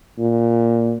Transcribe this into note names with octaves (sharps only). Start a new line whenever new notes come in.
A#2